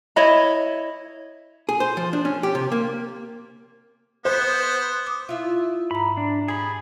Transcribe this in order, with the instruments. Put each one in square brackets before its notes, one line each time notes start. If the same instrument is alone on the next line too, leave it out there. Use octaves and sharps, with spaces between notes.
[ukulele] E4 C#5 D#5 B5
[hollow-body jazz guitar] G#4
C5
F3
D4
C#4
G4
C3
A#3
[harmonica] B3 [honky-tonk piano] C5
[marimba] D6 D#6
[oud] E4 F4
[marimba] G#2 A#5 [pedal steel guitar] B5
[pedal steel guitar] D4
[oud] G3 [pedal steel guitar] G#4 B5